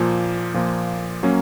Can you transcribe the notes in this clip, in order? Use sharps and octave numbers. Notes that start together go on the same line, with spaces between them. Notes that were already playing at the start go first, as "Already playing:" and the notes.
Already playing: A#2 F3 A#3
A#2 F3 A#3
F#3 A#3 C#4